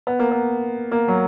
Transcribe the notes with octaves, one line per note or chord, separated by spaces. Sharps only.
B3
A#3
B3
A#3
F#3